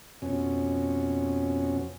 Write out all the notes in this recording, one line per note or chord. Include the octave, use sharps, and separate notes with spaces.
F2 B2 C#4